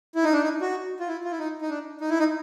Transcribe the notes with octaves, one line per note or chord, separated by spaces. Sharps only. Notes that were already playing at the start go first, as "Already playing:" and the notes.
E4
D#4
D4
D#4
F#4
F4
E4
F4
E4
D#4
D#4
D4
D#4
E4
D#4